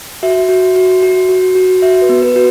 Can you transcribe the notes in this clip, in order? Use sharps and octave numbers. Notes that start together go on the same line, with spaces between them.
F#4 E5
F#4
F#4
F#4
F#4
F#4
F#4 E5
B4
B3
B4
F#4